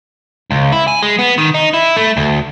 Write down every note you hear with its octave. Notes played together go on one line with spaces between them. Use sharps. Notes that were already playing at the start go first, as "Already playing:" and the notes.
C#2
E4
G#5
G#3
B3
D#3
D#4
E4
A3
D2